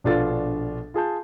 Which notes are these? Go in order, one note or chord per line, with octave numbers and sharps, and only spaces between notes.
A#1 B2 D4 F4 A4 A6
F4 G#4 A5 G6